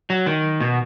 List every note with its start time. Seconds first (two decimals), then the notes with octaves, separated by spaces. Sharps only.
0.10 F#3
0.26 D#3
0.60 B2